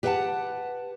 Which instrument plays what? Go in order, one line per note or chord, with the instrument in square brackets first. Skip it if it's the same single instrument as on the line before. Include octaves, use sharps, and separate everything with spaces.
[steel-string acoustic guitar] G4 B4 C5 E5 F#5 A5